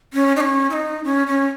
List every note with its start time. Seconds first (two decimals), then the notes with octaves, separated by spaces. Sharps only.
0.14 C#4
0.36 D#4
0.40 C#4
0.70 E4
0.73 D#4
1.04 C#4
1.27 C#4